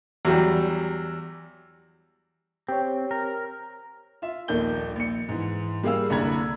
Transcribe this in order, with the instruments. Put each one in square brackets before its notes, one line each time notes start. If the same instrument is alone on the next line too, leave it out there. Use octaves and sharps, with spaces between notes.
[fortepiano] E2 F#3 G3
[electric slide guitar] C4 [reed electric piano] G4 C#5
[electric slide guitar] A#4
[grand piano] F4 E5
D#1 A#1 D#3 A4 G6 G7
A#1 C#7
G#2 E3
G3 A#3 G#4 F5 E6
F#1 C2 D3 A#5 B5 G#6